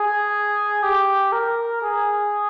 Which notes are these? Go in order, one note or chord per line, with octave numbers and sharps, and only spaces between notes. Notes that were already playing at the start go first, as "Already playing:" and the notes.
Already playing: G#4
G4
A#4
G#4